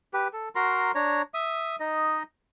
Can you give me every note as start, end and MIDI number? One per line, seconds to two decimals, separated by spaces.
0.13 0.28 67
0.13 0.28 71
0.33 0.49 69
0.55 0.92 66
0.55 0.92 70
0.55 0.92 82
0.55 0.92 84
0.95 1.22 62
0.95 1.22 73
0.95 1.22 82
1.34 1.76 76
1.34 1.76 87
1.80 2.23 63
1.80 2.23 75